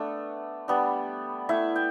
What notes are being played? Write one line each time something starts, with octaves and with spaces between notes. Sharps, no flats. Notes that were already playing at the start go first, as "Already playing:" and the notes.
Already playing: A3 B3 D4
G3 B3 D4
A3 E4 E5
G5